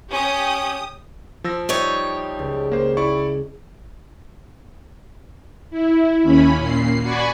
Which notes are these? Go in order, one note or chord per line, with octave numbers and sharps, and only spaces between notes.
C#4 G4 D#6
F3 E6 A#6
G3 D#4 C#5
C#2
A#3 C5
E4 D5 C#6
E4
D#2 C#4 B5
A#2 C7
F#4 D5 G#5 B5 C#6